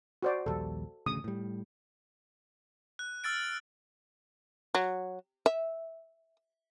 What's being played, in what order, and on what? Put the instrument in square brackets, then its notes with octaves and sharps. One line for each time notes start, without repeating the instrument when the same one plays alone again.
[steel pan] F#4 C5 D5
[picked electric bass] A#1 D#2 G3 [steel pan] A4
[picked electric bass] A1 D2 C#3 [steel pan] D#6
[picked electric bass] A2 G3
[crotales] F#6
E6 F6 A6 D7
[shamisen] F#3
E5